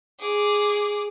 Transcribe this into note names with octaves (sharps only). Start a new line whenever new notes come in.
G#4 D6